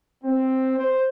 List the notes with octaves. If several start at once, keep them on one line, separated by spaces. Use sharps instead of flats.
C4
C5